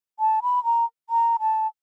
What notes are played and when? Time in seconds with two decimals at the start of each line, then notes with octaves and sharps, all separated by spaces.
0.20 A5
0.43 B5
0.64 A#5
1.10 A#5
1.40 A5